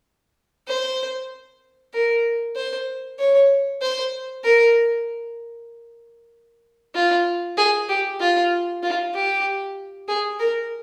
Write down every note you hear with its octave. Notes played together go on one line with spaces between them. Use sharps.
C5
A#4
C5
C#5
C5
A#4
F4
G#4
G4
F4
F4
G4
G#4
A#4